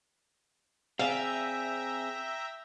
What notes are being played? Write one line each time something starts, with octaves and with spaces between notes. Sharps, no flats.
C4 G#4 D5 E5 F5 G5 A#5